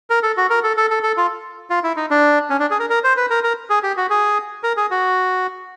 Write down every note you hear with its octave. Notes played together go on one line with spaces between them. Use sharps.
A#4
A4
F#4
A#4
A4
A4
A4
A4
F4
F4
E4
D#4
D4
C#4
D4
G#4
A#4
A#4
C5
B4
A#4
A#4
G#4
G4
F#4
G#4
A#4
G#4
F#4